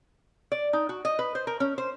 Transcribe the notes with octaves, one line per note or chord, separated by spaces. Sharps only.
D5
D#4
F#4
D#5
B4
C5
A#4
C#4
C5